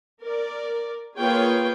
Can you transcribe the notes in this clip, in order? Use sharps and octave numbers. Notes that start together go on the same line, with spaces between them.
A#4 D5
A#3 F4 G#4 B4 C#5 G5